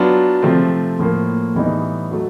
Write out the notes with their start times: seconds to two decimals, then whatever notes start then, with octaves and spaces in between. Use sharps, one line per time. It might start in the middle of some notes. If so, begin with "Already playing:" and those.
Already playing: F#3 B3 D4 F4
0.43 C3 F3 A3 C4
0.99 A2 F3 A#3
1.55 A2 E3 G3 B3 D#4
2.11 F#3 A3